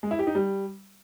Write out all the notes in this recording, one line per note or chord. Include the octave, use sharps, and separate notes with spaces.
G#3
E4
G4
D#4
G3